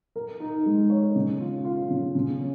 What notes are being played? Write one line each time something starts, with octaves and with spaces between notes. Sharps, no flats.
A#4
D#4
G#3
C#5
C#3
F4
F4
C#3
C#3
C#4